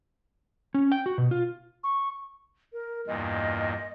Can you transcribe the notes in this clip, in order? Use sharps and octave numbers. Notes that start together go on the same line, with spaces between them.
C#4
G5
F#4
B2
F4
C#6
A#4
E2 G2 A#2 D#5